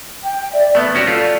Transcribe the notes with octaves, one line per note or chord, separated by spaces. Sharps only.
G5
D5 E5
A3 B3
C#4 F#4 G4
A3 F4 A4 D5 C#6